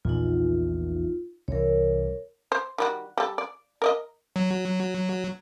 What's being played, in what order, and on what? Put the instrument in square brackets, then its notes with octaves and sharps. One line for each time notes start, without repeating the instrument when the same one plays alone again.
[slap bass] A#1 E2 [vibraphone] D#4 F4
[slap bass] C2 E3 [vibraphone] A#4 C#5
[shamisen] C5
D#3 G3 F#4
G3 A4
D5
A#4 D5 D#5
[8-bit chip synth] F#3